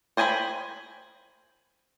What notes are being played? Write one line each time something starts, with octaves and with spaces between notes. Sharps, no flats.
C5 G5 G#5 A#5 B5